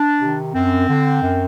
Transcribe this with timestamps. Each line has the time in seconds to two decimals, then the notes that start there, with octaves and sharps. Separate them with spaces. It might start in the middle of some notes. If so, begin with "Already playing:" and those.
Already playing: D4
0.22 C3 D#3
0.55 F#2 C4
0.89 D3
1.22 F#2